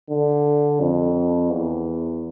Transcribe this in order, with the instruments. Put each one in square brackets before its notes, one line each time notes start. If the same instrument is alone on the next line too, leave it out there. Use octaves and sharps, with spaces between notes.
[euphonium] D3
F2
E2